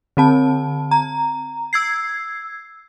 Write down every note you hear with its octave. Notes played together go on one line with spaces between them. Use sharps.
D3 C4 A5
A#5
E6 G#6 C7